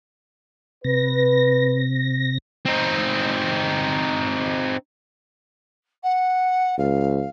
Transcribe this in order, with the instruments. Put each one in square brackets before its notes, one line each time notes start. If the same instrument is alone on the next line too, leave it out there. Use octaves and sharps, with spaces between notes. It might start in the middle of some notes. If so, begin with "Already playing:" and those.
[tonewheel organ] C3 A#6 [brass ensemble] B4
[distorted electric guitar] C4 D#4
[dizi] F#5
[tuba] C#2 [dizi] F5